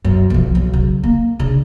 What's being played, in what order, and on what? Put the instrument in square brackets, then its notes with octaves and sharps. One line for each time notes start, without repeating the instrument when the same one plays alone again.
[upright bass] F#2
B1 F3
B1
C#3 F#3
A#3
C#3 D4